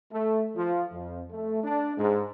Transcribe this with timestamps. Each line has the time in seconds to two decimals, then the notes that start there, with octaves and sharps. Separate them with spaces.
0.12 A3
0.56 F3
0.92 F2
1.31 A3
1.64 D4
1.98 G#2